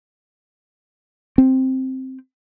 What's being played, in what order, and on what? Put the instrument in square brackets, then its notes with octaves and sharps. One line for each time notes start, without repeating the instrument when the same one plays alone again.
[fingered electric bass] C4